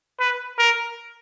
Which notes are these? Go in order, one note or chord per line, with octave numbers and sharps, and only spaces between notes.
B4
A#4